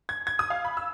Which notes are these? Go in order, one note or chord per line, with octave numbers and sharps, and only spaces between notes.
G#6
G#6
D#6
F5
B5
E6